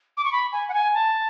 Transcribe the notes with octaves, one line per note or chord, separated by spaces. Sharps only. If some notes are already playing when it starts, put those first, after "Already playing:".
D6
C#6
B5
G#5
F#5
G#5
A5